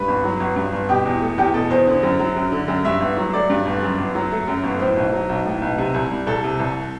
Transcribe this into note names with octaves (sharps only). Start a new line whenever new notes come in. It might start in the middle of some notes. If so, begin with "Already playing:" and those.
Already playing: G2 B4
G1
F#3
G1
G2
G1
B2 G4
E2
A3
E2 G4
B2 A4
E2 C5
D3
F#2
F#3
F#2
D3
F#2
G2 E5
G1
F#3
A3 D5
G2
G1
F#2
G1
F#3
A3
F#2
G1
A2 C5
B1
F#3
B1
A2
B1
C3
C2
G3
C2 A4
C3
C2